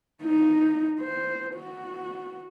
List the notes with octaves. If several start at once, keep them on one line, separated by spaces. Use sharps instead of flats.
D#4
C5
F#4